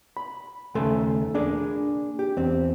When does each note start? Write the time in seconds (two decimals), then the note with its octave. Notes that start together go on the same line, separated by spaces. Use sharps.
0.17 B5
0.75 D#2 C#3 A3 A4 G#5 C6
1.34 A#3 D4 G#4
2.19 G4
2.37 E2 C4